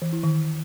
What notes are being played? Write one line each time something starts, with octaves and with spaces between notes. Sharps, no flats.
E3
E4
D#3